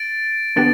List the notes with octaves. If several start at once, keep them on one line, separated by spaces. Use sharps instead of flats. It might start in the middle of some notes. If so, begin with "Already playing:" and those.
Already playing: A6 D7
D3 B3 G4 A6 D7